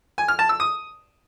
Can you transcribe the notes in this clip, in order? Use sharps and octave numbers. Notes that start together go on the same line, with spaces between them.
G#5
F6
A5
E6
D#6